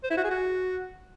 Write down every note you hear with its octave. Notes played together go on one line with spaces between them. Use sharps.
C5
E4
F#4
G#4
F#4